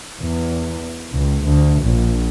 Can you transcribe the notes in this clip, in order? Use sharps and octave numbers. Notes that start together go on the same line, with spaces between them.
E2
C#2
D2
A#1